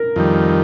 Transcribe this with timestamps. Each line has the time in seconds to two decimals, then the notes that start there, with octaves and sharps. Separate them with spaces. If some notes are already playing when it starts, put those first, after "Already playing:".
Already playing: A#4
0.16 F2 D#3 G3